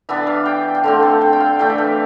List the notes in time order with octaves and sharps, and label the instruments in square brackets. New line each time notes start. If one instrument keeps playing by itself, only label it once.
[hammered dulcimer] E3 B3 D4 E5
F5
G5
G5
D3 A3 C4 F5
A4
G5
G5
F5
E3 A3 D4 G5
E5
F5